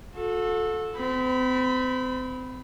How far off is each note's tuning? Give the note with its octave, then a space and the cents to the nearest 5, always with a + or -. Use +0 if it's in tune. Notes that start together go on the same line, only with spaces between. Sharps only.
F#4 -40 A4 -10
C4 -35 B5 +0